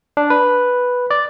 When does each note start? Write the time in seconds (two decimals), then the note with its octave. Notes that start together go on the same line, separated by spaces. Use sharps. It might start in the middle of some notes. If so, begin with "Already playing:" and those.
0.17 D4
0.30 B4
1.11 D5